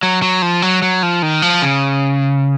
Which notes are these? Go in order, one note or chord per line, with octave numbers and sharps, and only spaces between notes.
F#3
F#3
F3
F#3
F#3
F3
D#3
F3
C#3